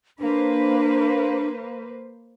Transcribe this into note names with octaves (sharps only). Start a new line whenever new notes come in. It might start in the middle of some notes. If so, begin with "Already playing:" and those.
A#3 D4 B4 C5